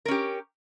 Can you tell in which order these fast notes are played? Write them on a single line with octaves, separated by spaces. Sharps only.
A#4 C#4 G4